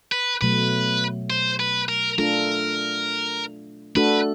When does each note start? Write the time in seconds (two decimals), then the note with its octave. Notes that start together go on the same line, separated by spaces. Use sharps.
0.12 B4
0.41 B2 F#3 A3 B4
1.30 C5
1.60 B4
1.89 A#4
2.18 A3 D4 F4 A4 A#4
3.95 A3 D4 F#4 A4 B4